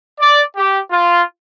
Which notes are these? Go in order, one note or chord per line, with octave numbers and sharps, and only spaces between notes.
D5
G4
F4